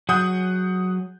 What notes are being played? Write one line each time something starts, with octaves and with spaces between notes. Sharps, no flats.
F#3 G#4 F#5 D#6 G6